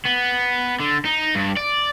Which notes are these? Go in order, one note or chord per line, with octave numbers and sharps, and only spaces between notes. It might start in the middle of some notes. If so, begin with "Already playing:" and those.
B3
D3
D#4
G2
D5